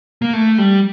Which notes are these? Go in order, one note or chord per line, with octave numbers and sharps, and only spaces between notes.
A#3
A3
G3